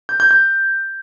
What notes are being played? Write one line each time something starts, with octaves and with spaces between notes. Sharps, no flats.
G6
G6
G6